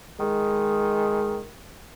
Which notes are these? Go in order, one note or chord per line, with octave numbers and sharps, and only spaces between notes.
D#3 G#3